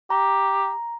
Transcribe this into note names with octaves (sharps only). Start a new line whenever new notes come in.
G4 A#5